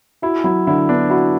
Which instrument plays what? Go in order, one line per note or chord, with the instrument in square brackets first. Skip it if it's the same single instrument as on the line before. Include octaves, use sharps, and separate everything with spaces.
[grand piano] E4 [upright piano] F#4
[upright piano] F#3 [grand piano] E4
[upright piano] D3 [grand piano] E4
[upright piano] B3 [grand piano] D4
[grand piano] E4 [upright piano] F#4